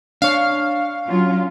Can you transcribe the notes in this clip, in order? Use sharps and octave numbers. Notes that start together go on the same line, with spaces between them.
D4 C#5 F5
F#3 C#4 F4